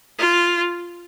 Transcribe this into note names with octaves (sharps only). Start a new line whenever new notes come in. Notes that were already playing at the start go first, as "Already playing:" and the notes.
F4